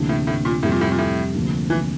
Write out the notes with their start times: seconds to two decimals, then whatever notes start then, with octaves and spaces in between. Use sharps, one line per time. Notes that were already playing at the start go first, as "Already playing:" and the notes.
Already playing: D2 C3 E3 A#3 D4
0.09 A2
0.27 A2
0.45 A#2
0.63 F2 A2 C3 G3
0.72 A#2
0.81 A2
0.92 A#2
0.98 A2
1.34 D2 C3 F3 A#3 D4
1.70 E3